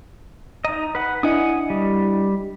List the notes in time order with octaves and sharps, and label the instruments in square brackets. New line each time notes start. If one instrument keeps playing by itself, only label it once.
[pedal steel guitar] D#4 D#5 [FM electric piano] A#5
[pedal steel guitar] B4 F#5
[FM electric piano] D4 E4 D#5 [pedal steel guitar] F#5 G#5 D#6
[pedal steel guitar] G3